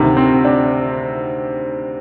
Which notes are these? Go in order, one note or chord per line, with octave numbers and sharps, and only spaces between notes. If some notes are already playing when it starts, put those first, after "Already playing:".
Already playing: D2 C3 D#3
C4
D4